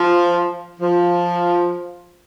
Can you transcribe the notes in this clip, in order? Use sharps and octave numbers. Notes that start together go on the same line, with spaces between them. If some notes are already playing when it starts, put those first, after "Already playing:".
Already playing: F3
F3